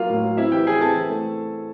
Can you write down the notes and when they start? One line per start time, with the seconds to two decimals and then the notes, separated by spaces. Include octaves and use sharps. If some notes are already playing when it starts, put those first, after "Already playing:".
Already playing: F#3 A#3 F4 F5
0.09 A2
0.23 F#3
0.37 C4 E4 E5
0.51 E3 G4 G5
0.66 E3 G#4 G#5
0.81 C4 A4 A5
0.95 E3
1.10 A3